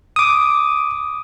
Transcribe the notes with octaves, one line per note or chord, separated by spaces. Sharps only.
D6 D#6